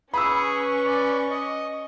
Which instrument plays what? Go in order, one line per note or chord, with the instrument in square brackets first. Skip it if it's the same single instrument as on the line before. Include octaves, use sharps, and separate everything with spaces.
[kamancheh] C#4 C#6 [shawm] G#4 [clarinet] B4 [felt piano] B5 E6
[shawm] D5
D#5